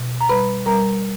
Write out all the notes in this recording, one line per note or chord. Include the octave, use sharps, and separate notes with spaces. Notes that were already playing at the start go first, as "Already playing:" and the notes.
Already playing: B2
A#5
G3 B4 B5
G3 A#4 A#5